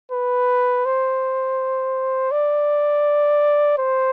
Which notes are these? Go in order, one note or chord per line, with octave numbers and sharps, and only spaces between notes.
B4
C5
D5
C5